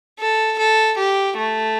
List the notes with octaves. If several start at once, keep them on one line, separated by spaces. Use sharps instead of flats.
A4
A4
G4
A3